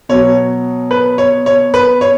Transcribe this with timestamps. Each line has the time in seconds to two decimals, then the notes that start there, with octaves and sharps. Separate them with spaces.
0.09 B2 F#3 C#5
0.91 B4
1.18 C#5
1.46 C#5
1.74 B4
2.01 C#5